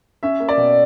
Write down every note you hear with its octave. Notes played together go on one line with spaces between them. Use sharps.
C#4 E5
A#3
D5
B2